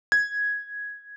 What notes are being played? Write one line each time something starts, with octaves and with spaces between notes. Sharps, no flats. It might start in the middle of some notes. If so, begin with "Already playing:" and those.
G#6